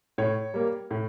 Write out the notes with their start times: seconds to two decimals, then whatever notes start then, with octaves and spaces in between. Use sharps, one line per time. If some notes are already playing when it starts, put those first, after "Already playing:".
0.18 A2 C#5
0.54 G3 A#3
0.91 A2